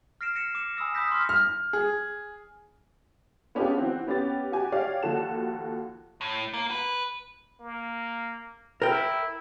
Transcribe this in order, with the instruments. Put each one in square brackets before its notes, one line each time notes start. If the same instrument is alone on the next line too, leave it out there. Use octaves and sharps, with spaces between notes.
[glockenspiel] F6 A#6 C7 D7 E7
A#6 C#7 E7
D6 C#7 E7
G#5 B5 D#6 E6 A#6
B5 D#6 E6 G6 A#6 B6
C6 D6 E6 F6 B6
[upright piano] F6
G#4
[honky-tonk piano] B3 C#4 D4 F4 G4 G#4
E3 C4 F#4
B3 C#4 G4 A6
F#4 G4 G#5
G4 C#5 D5 F5
D#2 F3 F#4 A4 E7
[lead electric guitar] A2
A#3
B4
[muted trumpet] A#3
[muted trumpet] E4 [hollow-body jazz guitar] A#4 G5